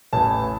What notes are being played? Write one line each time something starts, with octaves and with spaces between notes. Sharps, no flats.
A1 A2 E3 A5